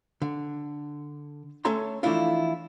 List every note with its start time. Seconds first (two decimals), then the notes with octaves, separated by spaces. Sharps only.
0.22 D3
1.65 A3 C#4 A4 C#5 A#5 C6
2.03 E3 F3 A3 D4 E4 F4